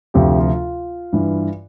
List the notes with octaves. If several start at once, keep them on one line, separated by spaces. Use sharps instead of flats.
D2 C3 F3 G4
F4
G2 E3